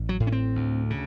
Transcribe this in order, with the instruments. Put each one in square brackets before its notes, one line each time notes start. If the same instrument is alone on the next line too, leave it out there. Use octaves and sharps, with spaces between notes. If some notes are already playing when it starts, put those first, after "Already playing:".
Already playing: [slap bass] A1
F#3
A2
C#4
C4
D2
C#3